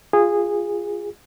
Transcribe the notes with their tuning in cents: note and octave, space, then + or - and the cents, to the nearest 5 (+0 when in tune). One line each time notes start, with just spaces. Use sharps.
F4 +0 G#4 -15